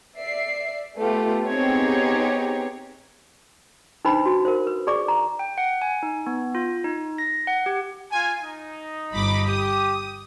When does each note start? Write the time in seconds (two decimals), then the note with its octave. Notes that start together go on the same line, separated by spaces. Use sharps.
0.17 D5 E5 C7
0.96 A3 B3 F4 G4
1.47 B3 C4 D#4 G4 G#4 C#5
4.05 D4 D#4 B4 C5 B5
4.26 F#4
4.45 A#4 C5
4.67 B4
4.87 G#4 D5 C#6 D6
5.08 A#5
5.39 G5
5.58 F#5
5.82 G#5
6.03 D#4
6.27 B3
6.55 F4
6.84 D#4
7.18 A#6
7.47 F#5
7.66 G4
8.12 F4 G#5
8.42 D#4
9.13 G1 B5 D6
9.47 G4 D#6